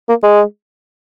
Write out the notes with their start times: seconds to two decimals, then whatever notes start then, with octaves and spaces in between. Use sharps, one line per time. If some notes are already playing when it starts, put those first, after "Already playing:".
0.09 A#3
0.23 G#3